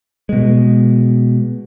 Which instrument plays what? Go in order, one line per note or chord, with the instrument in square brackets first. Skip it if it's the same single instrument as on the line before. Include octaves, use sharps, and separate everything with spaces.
[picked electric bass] B2 G#3